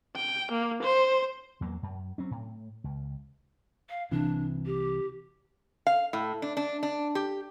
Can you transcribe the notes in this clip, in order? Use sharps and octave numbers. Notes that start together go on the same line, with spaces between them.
G5
A#3
C5
E2 F#3 A3 A#3
F#2
F#3 C4 C#4
A2
C#2
F5
C2 C3 E3 D4
G4
F5
A2
D4
D4
D4
G4